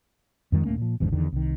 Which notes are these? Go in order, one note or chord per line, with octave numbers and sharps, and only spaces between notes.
F2 D#3 G#3
D1 A3 A#3 C#4
A#2 F3
G#1 E2 G#2 D3
E2 D3 D#3
C2 D#3